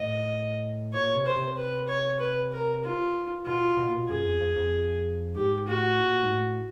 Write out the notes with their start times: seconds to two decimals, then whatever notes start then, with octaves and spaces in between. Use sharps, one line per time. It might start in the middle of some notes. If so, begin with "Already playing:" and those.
Already playing: A2 D#5
0.93 A#2 C#5
1.15 C3
1.25 C5
1.36 C3
1.57 B4
1.88 C#5
2.19 B4
2.52 A#4
2.83 F4
3.46 B2 F4
3.77 B2
3.87 A#2
3.96 B2
4.09 F#2 G#4
4.25 F2
4.40 F2
4.56 F2
5.35 G#2 G4
5.67 A2 F#4
5.99 A#2
6.22 G#2
6.30 A2